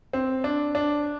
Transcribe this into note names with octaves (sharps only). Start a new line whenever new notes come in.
C4
D4
D4